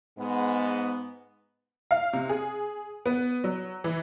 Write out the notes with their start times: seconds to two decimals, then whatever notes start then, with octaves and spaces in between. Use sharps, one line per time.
0.19 G#2 G#3 B3
1.91 F5
2.13 C3
2.29 G#4
3.06 B3
3.44 F#3
3.84 E3